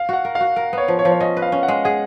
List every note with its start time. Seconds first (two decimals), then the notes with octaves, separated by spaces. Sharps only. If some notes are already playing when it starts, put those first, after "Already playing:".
Already playing: F5
0.09 F#4 F#5
0.25 A#4
0.35 F5
0.41 F#4
0.56 A#4
0.73 B3 C#5
0.88 F3
0.99 C#5
1.05 F3
1.12 C#5
1.20 C#4 D#5
1.37 B4
1.42 F5
1.52 C#4
1.63 F#5
1.68 G#3
1.85 G#4 F#5